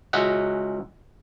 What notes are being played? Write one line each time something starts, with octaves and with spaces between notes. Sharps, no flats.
C#2 C#4 F#4 D#5 E5 F#5